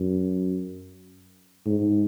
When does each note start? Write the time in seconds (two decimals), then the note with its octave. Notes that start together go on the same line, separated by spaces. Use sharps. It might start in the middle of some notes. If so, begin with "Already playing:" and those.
Already playing: F#2
1.66 G#2